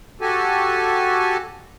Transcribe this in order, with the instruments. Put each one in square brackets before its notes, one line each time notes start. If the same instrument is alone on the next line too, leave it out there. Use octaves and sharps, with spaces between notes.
[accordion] F#4 G4 A4 G#5